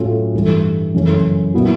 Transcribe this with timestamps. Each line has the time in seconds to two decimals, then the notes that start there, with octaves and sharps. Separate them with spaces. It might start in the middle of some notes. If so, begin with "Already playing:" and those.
Already playing: A2 F#3 A3 C#4 F4
0.34 G2 E3 A3
0.94 F#2 C#3 E3 A3 C#4
1.54 A#2 F#3 B3 E4